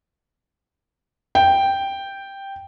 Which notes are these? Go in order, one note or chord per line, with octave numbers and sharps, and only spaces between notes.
G5